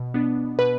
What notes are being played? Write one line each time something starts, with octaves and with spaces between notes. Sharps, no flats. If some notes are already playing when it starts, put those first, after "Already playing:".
Already playing: B2
B3 D4
B2 B4